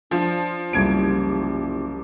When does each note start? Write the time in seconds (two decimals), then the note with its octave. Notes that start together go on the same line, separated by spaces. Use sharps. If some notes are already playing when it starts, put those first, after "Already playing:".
0.11 F3 D4
0.73 F#1 C2 G4 G#6 D7